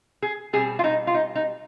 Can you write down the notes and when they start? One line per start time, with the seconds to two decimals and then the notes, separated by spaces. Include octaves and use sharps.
0.22 G#4
0.53 B2 G3 C4 G#4
0.79 F4
0.84 D#4
1.07 F4
1.14 D#4
1.35 D#4